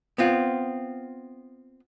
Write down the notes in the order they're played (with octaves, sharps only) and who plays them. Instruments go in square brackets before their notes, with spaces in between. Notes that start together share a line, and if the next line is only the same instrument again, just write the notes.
[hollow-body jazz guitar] B3 C4 F4